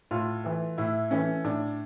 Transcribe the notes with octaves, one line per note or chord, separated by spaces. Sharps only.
A2 F4
E3 A3
A2 E4
E3 A3 C#4
A2 D4